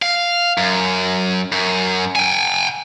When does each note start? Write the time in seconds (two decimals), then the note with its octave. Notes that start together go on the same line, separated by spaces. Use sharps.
0.02 F5
0.58 F#2
1.52 F#2
2.16 G5 G#5